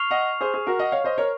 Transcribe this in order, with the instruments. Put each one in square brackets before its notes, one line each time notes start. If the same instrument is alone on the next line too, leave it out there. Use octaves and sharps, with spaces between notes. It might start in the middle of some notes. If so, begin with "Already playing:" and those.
Already playing: [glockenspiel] C#6 F6 C7 F7
[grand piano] D#5 F#5
G#4 C5
G#4
F#4 A#4
D#5 F#5
C#5 F5
C5 D#5
A#4 C#5